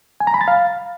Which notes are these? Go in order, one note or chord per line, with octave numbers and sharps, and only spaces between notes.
G#5
A#5
B5
A6
F5